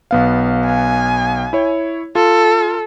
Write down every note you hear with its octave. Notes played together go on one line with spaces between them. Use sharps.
B1 B3 F5
G#5
E4 C#5
F4 A4